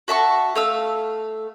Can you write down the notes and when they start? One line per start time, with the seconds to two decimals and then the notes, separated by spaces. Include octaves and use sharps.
0.08 F#4 E5 A5 C#6
0.55 A3 F5 E6